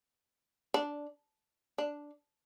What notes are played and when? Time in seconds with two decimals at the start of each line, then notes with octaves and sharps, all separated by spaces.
0.74 D4
1.78 D4